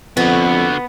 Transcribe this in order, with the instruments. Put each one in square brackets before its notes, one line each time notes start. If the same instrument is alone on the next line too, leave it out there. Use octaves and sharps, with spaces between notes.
[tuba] F2 [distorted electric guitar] D3 F#4 [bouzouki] B3